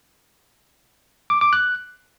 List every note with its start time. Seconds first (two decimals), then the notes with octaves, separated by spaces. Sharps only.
1.30 D6
1.41 D6
1.53 F#6